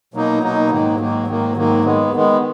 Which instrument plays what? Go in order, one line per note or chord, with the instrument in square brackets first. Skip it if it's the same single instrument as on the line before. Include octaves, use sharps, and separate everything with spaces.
[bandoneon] B2 F#3 A#3 D#4
B2 F#3 A#3 D#4
G#2 D#3 F#3 A#3
G#2 D#3 F#3 A#3
G#2 D#3 F#3 A#3
G#2 D#3 F#3 A#3
D#3 G#3 B3
D#3 G#3 B3